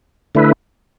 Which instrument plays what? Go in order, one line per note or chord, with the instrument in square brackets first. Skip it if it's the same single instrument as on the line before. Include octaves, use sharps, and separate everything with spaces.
[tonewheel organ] D3 A3 E4 B4